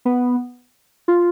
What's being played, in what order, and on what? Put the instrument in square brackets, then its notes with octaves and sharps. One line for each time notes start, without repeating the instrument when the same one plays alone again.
[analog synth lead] B3
F4